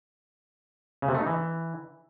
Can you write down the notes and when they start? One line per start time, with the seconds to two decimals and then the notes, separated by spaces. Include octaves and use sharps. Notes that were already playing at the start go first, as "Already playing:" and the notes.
1.02 C#3
1.08 C3
1.14 A3
1.21 D#4
1.27 E3